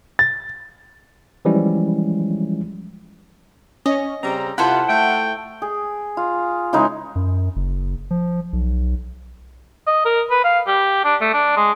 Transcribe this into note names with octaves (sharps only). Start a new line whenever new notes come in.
A6
E3 F3 G3 G#3 C#4 E4
C#4 D#5
C#3 G3 C4 A#5
C3 E4 F4 A4 C5 F#5
A3 G5
G#4
F4
C#3 E3 G#3 D#4
F#2
F#1
F3
B1
D#5
A#4
B4
F5
G4
D4
A3
D4
G#3